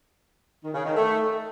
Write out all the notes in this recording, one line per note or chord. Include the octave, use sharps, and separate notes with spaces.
D#3
C#3
D#3
A3